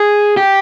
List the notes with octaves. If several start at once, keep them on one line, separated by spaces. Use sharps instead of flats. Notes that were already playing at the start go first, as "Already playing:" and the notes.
Already playing: G#4
G4